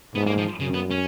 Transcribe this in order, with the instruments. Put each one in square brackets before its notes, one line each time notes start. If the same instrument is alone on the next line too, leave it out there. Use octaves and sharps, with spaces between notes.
[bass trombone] G#2 [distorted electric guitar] B3
[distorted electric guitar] A#3
F3
[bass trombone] F#2 [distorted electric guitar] C#3
[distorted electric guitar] B3
C#4